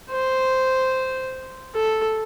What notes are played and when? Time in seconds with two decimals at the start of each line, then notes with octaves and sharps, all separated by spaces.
0.11 C5
1.75 A4